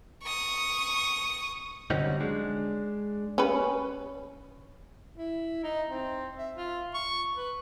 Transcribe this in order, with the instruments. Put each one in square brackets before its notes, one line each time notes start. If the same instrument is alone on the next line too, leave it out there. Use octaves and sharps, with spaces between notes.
[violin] C#6 D#6
[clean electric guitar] D3 F#3 G3 C4 C#4 D#4
G#3 D4
[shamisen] C#4 B4
[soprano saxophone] E4
D#4
C4
E5
F4
C#6
B4